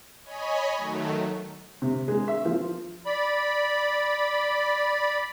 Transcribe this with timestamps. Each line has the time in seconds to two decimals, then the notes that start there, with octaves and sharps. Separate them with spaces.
0.24 C#5 D#5 G#5 B5
0.78 D#3 F#3 A3
1.82 C3
2.08 G#3
2.28 E5
2.45 F3
3.05 D5 B5